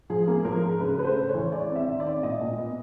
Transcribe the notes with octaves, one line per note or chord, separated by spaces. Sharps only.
F3 G#4
A#3
F3 A#4
G#2
C#3 B4
A3 B4
C5
C#3
C#5
E3
G#3 D5
C4
E5
D#3
D5
C4
A#2 D#5
A#2
B3